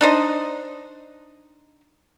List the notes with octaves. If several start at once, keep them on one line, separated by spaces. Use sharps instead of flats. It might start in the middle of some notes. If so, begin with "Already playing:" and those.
D4 D#4 C5 D#5